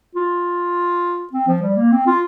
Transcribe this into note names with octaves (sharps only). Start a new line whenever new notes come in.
F4
C4
F3
G3
A#3
C4
F4